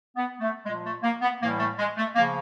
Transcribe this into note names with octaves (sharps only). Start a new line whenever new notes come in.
B3
A3
A#2 F3 G#3
A3
A#3
B3
A2 E3 G3 A#3
A3
G#3
A3
C#3 F3 A#3